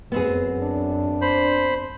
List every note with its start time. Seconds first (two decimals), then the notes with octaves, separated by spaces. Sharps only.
0.12 F#2 B3 C4 G#4
0.60 D4
1.22 C5 B5